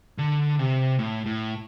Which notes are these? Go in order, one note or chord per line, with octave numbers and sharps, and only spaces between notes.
D3
C3
A2
A2